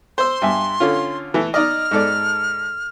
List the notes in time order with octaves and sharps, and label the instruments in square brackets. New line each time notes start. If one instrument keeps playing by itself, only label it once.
[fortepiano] C5 E6 [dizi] C6
[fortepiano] G2 E5 G#5
D3 C#4 F4
E3 A3 A4
[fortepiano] D#4 D5 D#5 [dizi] F6
[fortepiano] G#2 A4 D5